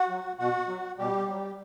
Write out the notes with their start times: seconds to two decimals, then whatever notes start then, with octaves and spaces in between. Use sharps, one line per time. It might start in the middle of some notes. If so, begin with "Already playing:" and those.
Already playing: F#4 F#5
0.09 F#3
0.39 B2 F#4 F#5
0.68 F#3
0.98 B2 G3 G4
1.28 F#3